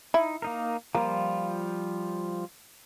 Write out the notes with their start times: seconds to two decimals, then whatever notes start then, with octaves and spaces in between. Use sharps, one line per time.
0.14 D#4 E4
0.42 A#3 D#4 A#4
0.95 F3 G3 A#3 F4